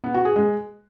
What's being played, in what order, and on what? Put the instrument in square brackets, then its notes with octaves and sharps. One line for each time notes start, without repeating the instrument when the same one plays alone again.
[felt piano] B3
F#4
G#4
G#3